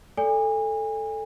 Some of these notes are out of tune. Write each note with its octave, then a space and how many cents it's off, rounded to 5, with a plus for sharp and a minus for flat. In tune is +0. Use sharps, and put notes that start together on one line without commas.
A4 +0 D5 -20 G#5 -35